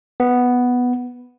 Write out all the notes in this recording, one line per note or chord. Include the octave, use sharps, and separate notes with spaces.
B3